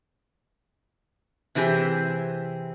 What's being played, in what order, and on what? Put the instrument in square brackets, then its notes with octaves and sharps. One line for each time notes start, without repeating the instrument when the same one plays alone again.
[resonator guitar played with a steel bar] C3 E3 C4 G4 G#4